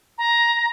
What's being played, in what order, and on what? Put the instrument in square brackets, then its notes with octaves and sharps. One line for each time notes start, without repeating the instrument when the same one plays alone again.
[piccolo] A#5